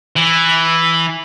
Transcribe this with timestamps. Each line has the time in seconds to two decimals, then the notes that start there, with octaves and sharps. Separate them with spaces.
0.16 E3